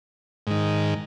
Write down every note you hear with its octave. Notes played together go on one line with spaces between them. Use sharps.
G#2 D#3